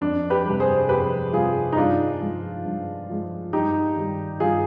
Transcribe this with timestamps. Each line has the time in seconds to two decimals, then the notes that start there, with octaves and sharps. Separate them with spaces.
0.01 F2 D4
0.30 G4 B4
0.45 C3 G3
0.60 G#4 C5
0.89 F2 G4 B4
1.33 C3 G3 F4 G#4
1.72 D#4
1.77 G2 D4 F4
2.20 F3 G#3
2.65 G2
3.09 F3 G#3
3.53 G2 D#4 G4
3.96 D#3 G3
4.40 G2 F4 G#4